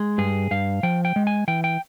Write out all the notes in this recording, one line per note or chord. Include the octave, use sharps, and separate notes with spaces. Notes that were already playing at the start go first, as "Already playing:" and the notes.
Already playing: G#3
G2 G#4
G2 F5
F3 G5
G5
G#3
G#5
E3 G5
G5